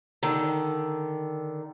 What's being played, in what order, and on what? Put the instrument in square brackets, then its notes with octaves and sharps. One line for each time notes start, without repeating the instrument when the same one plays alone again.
[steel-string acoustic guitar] D3 D#3